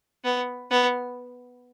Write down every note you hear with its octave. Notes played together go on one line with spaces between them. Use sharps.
B3
B3